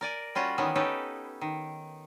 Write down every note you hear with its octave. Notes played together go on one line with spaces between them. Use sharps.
A#4 D5 G#5
G3 C#4 F4 F#4 C#5
D#3 E3 B3 C#4
C#4 D#4 G4 A4 B4
D#3